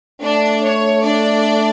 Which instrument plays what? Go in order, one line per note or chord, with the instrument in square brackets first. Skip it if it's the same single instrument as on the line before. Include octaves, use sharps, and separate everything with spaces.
[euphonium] A3 [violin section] D4 D5
[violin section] C#5
D4 D5